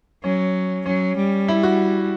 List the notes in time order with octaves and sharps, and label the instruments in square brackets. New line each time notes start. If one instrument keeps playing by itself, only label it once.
[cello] F#3 [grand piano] C#4
[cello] F#3 [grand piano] C#4
[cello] G3
[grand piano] E4
F#4